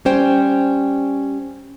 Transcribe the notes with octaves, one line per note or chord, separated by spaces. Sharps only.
G3 C#4 C5 G5